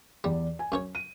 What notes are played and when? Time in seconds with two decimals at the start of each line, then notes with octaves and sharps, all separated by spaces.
0.24 E2 G3 D5
0.59 G#5
0.72 F#2 C#4 C#5
0.95 D#7